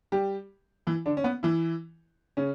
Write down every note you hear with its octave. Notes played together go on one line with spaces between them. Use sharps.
G3 G4
E3 E4
D3 D4
C#4
B3
E3 E4
C#3 C#4